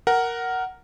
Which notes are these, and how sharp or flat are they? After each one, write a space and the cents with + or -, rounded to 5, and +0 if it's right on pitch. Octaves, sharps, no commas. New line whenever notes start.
A#4 +0 F#5 +10